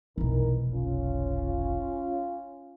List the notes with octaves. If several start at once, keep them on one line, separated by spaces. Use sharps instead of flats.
F1 B1 E3 D#4 A#4
C#4 F4